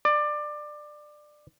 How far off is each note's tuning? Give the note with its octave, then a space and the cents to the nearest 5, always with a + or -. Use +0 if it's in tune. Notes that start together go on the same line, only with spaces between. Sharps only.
D5 +20